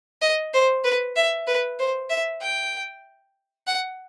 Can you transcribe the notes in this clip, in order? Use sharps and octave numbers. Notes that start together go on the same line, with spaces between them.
D#5
C5
B4
E5
B4
C5
E5
G5
F#5